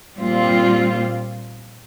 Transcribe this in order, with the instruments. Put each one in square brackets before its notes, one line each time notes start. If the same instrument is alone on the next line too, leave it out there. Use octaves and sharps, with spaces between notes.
[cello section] A#2 G3 C4 F4